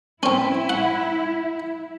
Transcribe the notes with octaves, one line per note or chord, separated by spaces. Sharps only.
C4 C#4 E4
F#5